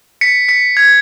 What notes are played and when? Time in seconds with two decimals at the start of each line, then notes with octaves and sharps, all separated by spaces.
0.21 B6 C#7
0.48 B6 C#7
0.77 G#6